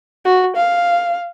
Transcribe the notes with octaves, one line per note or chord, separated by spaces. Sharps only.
F#4
F5